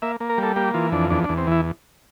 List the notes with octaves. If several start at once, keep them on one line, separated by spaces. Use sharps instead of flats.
A#3 E5
A#3
A#4
G3 A4
A#3 G4
E3 F4
F2 D4
E2 D4
D4
E2
C4
E3 E4